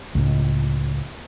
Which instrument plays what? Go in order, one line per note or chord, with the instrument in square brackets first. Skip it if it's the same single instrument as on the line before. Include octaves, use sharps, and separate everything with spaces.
[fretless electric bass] C#2 A2